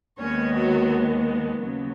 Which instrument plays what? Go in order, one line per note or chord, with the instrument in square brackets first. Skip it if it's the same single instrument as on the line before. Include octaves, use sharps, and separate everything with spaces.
[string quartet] D#2 D#3 G#3 B3 C#4 C#5
F#3 F#4
D#2 C#3 F#3 B3